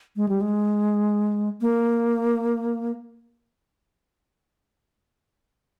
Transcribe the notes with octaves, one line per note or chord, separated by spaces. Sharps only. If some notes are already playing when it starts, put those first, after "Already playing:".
G#3
G3
G#3
A#3